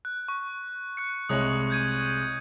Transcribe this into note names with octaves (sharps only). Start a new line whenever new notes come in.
F#6
C#6
F#6 C#7
C2 G#3 C#5 D#6 F#6 F#7
G6 G#6 D#7